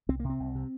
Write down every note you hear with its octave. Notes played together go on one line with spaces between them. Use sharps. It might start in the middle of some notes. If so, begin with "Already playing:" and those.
C2 C4
A#3
C3
C4
C2
C3